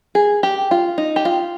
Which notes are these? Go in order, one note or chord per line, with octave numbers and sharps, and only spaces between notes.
G#4
G4
F4
D#4
G4
F4